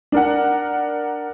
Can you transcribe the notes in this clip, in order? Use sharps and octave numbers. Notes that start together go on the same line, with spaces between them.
D4 A#4 F#5